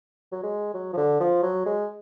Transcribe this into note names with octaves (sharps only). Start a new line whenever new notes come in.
F#3
G#3
F#3
F3
D3
F3
F#3
G#3